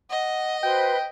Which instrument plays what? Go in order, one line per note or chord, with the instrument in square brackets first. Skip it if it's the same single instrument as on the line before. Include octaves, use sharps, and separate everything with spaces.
[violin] D#5 [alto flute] F#5
[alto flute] F#4 [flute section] B4 C5 [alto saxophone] G5